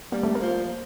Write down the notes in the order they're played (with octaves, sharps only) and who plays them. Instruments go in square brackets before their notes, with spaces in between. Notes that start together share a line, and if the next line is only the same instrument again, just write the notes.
[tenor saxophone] G3 [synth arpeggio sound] A#3
[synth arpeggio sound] A3
A#3
[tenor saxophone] F3